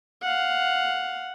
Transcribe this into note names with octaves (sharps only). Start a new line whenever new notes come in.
F5 F#5